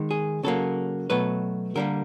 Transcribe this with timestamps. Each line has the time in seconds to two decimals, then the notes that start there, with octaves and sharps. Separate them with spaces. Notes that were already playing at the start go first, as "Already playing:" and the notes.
Already playing: D#3 G#3
0.11 G#4
0.43 C#3 F#3 A#3 A4
1.10 B2 F#3 A3 B4
1.75 D3 G3 A#3 A#4